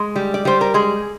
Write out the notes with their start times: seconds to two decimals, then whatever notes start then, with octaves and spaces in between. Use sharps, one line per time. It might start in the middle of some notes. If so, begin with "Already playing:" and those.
Already playing: G#3
0.16 G3
0.34 D5
0.45 G3 C5
0.61 A#4
0.74 G#3 G#4